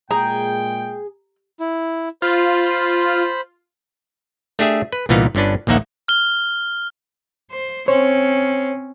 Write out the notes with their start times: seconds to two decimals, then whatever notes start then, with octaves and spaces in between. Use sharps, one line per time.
0.11 A#2 G#3 G#4 G5 A#5
1.59 E4
2.22 F4 C5 B5
4.59 A3 D4 G4 G#4 E5
4.92 B4
5.09 C2 A#2 E3 B3 D#4 F5
5.35 G1 D3 C#4 D4 B4
5.67 A#1 D#2 A#3 D#4 E5 F#5
6.08 F6 G7
7.52 C5
7.88 C4 C#4 C5 C#5